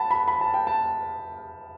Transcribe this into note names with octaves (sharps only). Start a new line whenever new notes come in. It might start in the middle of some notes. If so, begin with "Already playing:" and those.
Already playing: F#5 A5 B5
B5
B5
A5
G5
A5